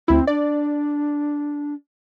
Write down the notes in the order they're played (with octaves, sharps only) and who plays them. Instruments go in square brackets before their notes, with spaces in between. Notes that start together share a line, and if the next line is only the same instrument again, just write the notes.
[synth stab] D2 E4 [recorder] C4
[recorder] D4 [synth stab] D5